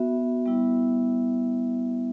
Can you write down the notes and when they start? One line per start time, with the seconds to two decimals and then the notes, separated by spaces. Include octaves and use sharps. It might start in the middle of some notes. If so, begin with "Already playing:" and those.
Already playing: B3 F#4 E5
0.45 G3 B3 E4